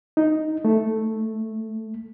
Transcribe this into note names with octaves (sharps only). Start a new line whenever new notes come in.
D#4
A3